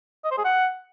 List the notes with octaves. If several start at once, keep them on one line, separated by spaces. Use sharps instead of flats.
D#5
C5
G#4
F#5